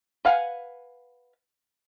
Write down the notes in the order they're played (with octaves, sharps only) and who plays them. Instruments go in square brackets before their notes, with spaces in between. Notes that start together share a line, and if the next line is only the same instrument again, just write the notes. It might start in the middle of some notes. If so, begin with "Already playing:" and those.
[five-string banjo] B4 F5 F#5 G#5